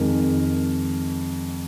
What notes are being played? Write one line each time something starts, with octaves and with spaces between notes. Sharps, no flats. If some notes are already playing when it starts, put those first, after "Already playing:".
Already playing: F2 D#3 G#3 A#4